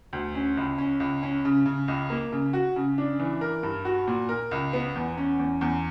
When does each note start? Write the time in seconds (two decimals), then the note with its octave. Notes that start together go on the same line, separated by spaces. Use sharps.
0.13 D2
0.35 C#4
0.57 C#2
0.78 C#4
1.00 C#2
1.23 C#4
1.45 C#3
1.66 C#3
1.88 C#2
2.10 A#3
2.32 C#3
2.53 F#4
2.76 C#3
2.98 D4
3.20 E3
3.41 A#4
3.63 G2
3.85 F#4
4.08 A#2
4.29 A#4
4.51 C#2
4.73 B3
4.95 E2
5.17 C#4
5.39 E2
5.61 E2